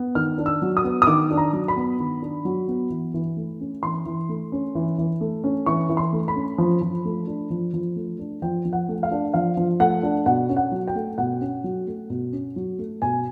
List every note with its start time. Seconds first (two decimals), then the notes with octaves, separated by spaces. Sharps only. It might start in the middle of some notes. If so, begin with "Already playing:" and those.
Already playing: B3
0.15 D#3 F6
0.38 D4
0.46 E6
0.62 F#3
0.77 D#6
0.84 B3
1.02 D#6
1.07 D#3 D6
1.31 D4
1.37 A#5
1.53 F#3
1.68 B5
1.76 B3
2.00 D#3
2.22 D4
2.45 F#3
2.68 B3
2.90 E3
3.14 E3
3.37 A3
3.60 C#4
3.83 E3 C6
4.06 E3
4.29 A3
4.52 C#4
4.75 E3
4.98 E3
5.21 A3
5.44 C#4
5.66 E3 C#6
5.89 E3
5.97 C6
6.13 A3
6.28 B5
6.35 C#4
6.58 F3
6.82 F3
7.05 A3
7.27 D4
7.50 F3
7.74 F3
7.96 A3
8.19 D4
8.42 F3 G5
8.65 F3
8.73 F#5
8.89 A3
9.03 F5
9.11 D4
9.34 F3 F5
9.57 F3
9.80 A3 F#5
10.03 D4
10.26 B2 F#5
10.49 C#4
10.57 F#5
10.72 F#3
10.88 G5
10.95 A3
11.18 B2 F#5
11.41 C#4
11.64 F#3
11.87 A3
12.10 B2
12.32 C#4
12.56 F#3
12.79 A3
13.02 B2 G#5